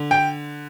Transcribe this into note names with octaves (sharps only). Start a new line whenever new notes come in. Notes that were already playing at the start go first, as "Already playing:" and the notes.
Already playing: D3
G5